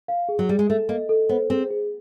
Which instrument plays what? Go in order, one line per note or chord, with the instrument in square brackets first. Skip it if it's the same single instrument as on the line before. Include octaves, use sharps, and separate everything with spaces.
[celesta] F5
G#4
[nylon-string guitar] F#3
[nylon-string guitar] G3 [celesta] G#4
[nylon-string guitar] G#3
[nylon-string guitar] A3 [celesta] A4
[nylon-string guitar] A#3 [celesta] D#5
[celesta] A4
[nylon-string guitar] B3 [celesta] C5
[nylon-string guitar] C4 [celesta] G#4
[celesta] G#4